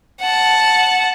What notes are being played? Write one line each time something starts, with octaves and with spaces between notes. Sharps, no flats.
F#5 A5